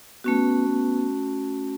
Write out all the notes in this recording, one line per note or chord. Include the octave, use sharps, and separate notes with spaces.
A3 B3 C#4 F#4
B3